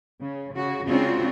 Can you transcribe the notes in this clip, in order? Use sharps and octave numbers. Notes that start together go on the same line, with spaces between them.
C#3
C#3 F#4
C#3 G#3 C4 D4 F4 F#4